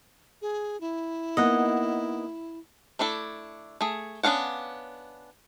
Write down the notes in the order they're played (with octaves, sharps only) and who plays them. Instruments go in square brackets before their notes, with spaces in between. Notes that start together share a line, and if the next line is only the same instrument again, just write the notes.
[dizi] G#4
E4
[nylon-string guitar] A#3 B3 D#4 [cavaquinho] D#5 F#5
[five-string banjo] A3 D4 E4 A4
A3 G#4
B3 C#4 D4 F5 F#5